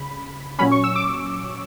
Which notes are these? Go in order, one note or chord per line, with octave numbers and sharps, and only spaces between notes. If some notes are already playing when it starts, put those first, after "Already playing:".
Already playing: C#3 B5
A#2 F#3 C#4 B5
C#6
E6
D6